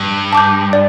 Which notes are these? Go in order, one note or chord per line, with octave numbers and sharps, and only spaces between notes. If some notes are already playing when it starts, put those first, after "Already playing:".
Already playing: G2
A5 D6 G6
D5